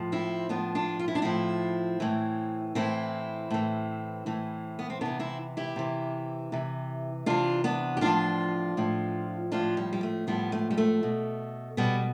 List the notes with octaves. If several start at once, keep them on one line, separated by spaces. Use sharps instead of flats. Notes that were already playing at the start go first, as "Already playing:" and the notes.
Already playing: A2 F3
C4 E4
A2 F3 B3 D4
D4 F4
F4
E4
D4
A2 F3 C4 E4
A2 E3
A2 E3 C4 E4
A2 E3
A2 E3
B3
C4
C3 E3 B3 D4
C4 E4
E4 G4
C3 E3
C3 E3
C3 E3 D4 F4
B3 D4
G4
A2 F3 D4 F4
A2 F3
A2 F3 D4 F4
G3
G3
A3
A2 F3 G3 B3
A3
G3
A3
B2
B2 G3 B3